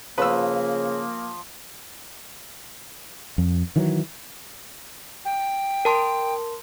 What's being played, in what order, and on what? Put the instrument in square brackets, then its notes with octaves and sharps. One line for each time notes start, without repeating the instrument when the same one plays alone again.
[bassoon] C#3 [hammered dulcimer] F3 [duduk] A#3 [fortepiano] B4 E6
[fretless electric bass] F2
D#3 E3 F#3
[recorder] G5
[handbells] A#4 A5 C6